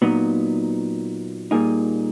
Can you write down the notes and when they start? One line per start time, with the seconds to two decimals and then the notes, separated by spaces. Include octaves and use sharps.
0.02 A#2 F#3 B3 D#4
1.51 A#2 G3 A#3 D#4 G#4